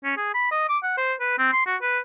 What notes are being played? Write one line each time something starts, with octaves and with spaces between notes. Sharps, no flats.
C#4
G#4
B5
D#5
D6
F#5
C5
B4
C4
C6
F#4
B4